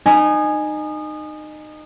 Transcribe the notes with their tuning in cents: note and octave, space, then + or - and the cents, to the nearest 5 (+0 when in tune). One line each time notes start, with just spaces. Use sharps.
D#4 -25 G#5 +0